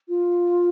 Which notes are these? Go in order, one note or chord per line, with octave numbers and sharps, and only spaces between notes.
F4